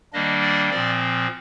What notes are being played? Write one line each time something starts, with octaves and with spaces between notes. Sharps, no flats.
D#3 G3 A#3 D4 D#5
D5
A#2 F3 C4 D5